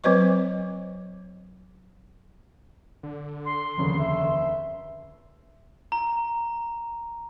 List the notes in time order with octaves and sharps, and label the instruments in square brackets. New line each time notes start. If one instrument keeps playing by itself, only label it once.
[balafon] F#3 C4 B4 C5 D#5 C#6
[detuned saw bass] D3
[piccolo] C6
[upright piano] F1 D#2 C#3
[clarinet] E5
[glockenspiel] A#5